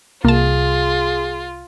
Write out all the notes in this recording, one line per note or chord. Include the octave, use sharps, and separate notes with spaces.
C2 A#3 F4 G#4 A5